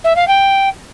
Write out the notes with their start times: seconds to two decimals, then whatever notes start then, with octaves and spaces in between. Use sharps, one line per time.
0.04 E5
0.16 F5
0.27 G5